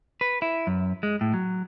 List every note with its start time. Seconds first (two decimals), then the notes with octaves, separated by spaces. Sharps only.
0.21 B4
0.42 E4
0.67 F#2
1.03 G#3
1.21 A2
1.34 F#3